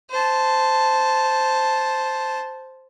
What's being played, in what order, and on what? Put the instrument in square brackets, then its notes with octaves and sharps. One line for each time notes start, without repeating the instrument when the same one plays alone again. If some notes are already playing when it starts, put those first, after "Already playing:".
[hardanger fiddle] C5 A5